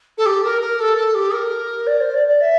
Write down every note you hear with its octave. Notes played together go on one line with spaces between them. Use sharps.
A4
G4
A#4
A#4
A4
A4
G4
A#4
D5
C5
D5
D5
E5